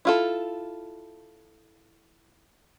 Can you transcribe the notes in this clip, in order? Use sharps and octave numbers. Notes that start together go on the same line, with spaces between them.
E4 F4 A4